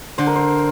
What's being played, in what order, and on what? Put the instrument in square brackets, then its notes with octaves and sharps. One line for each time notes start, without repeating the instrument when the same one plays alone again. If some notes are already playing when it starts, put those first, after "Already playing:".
[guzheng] D3 [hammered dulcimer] C5
[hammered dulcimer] A#4
C5